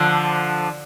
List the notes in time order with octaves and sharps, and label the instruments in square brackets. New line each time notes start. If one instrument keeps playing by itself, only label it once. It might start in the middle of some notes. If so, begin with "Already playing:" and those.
Already playing: [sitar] D3 F3